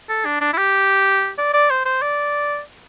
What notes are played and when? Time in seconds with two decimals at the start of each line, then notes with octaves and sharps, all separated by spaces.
0.09 A4
0.25 D4
0.41 D4
0.53 E4
0.58 G4
1.38 D5
1.53 D5
1.70 C5
1.85 C5
2.02 D5